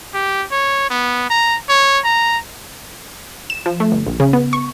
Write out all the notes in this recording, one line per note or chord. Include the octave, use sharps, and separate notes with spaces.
G4
C#5
B3
A#5
C#5
A#5
E7
F3
A3
G1
A#1
C#3
B3
C#6